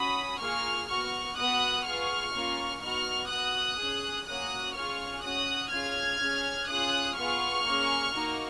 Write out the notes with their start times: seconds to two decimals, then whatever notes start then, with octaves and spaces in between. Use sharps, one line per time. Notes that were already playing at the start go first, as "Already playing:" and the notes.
Already playing: C#4 F#4 B5 D#6
0.40 A#3 F4 G#4 C#6 F6
0.88 B3 F#4 C#6 F6
1.36 B3 F#4 D#6 F#6
1.85 B3 F4 G#4 C#6 F6
2.33 A#3 C#4 F4
2.81 B3 D#4 F#4 C#6 F6
3.30 B3 F#4 D#6 F#6
3.78 C#4 G#4
4.26 A#3 C#4 F#4 D#6 F#6
4.75 C#4 F4 G#4 C#6 F6
5.23 C#4 F#4 D#6 F#6
5.71 C#4 F4 G#4 F6 G#6
6.19 C#4 G#4
6.68 C#4 F4 G#4 D#6 F#6
7.16 B3 F4 G#4 C#6 F6
7.65 A#3 C#4 G#4
8.13 A#3 D#4 F#4